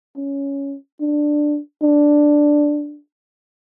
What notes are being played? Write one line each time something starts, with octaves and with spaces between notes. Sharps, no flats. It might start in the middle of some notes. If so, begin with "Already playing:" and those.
C#4
D4
D4